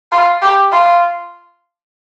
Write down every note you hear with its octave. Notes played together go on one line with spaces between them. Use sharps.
F4
G4
F4